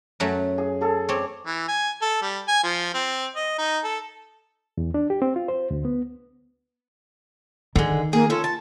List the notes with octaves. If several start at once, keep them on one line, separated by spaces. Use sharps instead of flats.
F#2 F#3 A3
G#4
G#4 A4
C4 C#5 D5
E3
G#5
A4
G3
G#5
F3
C4
D#5
D#4
A4
E2
D4
G4
C4
F4
C5
D2
B3
D3 D#3 G#3
A#3 G#4
C#4 F4 A4
A5